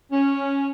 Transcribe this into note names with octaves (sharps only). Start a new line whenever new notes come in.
C#4